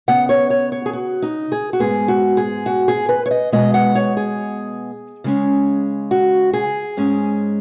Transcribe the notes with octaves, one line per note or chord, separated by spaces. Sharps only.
C#3 B3 F#5
C#5
C#5
C#5
G#4
F#4
D#4
G#4
F#4
G#2 G#3 B3 G#4
F#4
G#4
F#4
G#4
B4
C#5
D#5
B2 G#3 B3 D#5
F#5
C#5
G#4
C#3 G#3 C#4
F#4
G#4
G#2 G#3 C#4